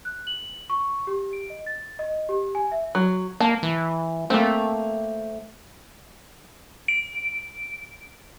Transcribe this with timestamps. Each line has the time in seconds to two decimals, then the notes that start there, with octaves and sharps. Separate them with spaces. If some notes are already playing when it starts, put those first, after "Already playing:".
0.05 F#6
0.27 F#7
0.70 C#6
1.07 G4
1.33 D7
1.50 D#5
1.66 A6
1.99 D#5
2.29 G4
2.55 G#5
2.72 E5
2.95 F#3
3.40 A#3 A5
3.63 E3
4.30 A3 A#3 C4
6.88 D7